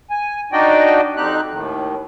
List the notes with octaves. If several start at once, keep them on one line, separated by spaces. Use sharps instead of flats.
G#5
D4 D#4 F#4 D5 D#5 G5
F2 C4 D#4 G4 F#6
D#2 A2 D#3